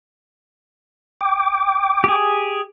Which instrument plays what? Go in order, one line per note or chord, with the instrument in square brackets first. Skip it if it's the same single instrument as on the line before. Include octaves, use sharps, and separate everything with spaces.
[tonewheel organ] G5 D6
[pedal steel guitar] G4 G#4